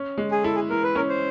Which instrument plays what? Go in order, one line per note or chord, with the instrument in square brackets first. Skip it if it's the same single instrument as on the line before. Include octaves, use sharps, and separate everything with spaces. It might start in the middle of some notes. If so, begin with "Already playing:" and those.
Already playing: [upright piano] C#4
G#3
[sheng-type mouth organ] G#4
[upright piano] E4 [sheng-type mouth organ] A4
[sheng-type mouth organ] G#4
[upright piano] E3 [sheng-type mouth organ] A#4
[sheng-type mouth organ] B4
[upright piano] C#4 [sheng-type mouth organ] A#4
[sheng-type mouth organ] C5